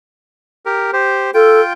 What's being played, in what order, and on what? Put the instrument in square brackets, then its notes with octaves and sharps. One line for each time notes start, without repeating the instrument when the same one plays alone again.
[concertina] G4 A#4
G4 C5
[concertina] F4 G5 [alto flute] A4